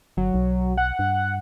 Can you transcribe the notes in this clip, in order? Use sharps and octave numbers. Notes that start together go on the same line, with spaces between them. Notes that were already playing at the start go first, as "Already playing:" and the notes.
G1 F#3
B1
F#5
G2